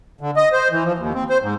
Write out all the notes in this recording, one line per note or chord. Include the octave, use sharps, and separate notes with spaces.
D3
D#5
C5
E3
F3
D#2
C4
C5
G#2